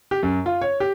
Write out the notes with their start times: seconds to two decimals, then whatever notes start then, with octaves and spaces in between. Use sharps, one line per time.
0.11 G4
0.23 F#2
0.46 F4
0.62 C#5
0.80 G4